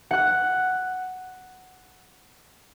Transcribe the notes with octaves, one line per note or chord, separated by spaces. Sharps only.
F#5 F#6